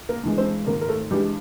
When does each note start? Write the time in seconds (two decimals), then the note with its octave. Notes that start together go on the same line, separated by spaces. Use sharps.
0.09 A#3 A#4
0.23 G2 E3 G#3
0.38 C4 C5
0.67 G#1 A#3 A#4
0.81 A#4
0.89 A3 A4
1.10 G2 E3 G3 G#3 G4